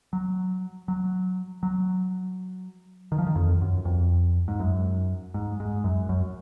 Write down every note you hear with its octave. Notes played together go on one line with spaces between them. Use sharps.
F#3
F#3
F#3
D#3
F3
D#3
F2
F#2
F2
G#2
F#2
G#2
G#2
F#2
F#2